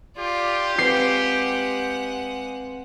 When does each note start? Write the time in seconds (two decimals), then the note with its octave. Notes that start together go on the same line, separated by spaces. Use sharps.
0.17 F4 G4 D5
0.78 G#3 C4 B4 F5 F#5 C7